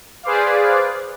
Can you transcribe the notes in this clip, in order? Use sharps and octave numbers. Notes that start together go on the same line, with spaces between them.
G#4 B4 C5 D5 F5